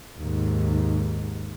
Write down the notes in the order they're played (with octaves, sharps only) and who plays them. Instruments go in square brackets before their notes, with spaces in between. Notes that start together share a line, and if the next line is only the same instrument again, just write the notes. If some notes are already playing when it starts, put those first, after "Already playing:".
[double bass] D#2 G#2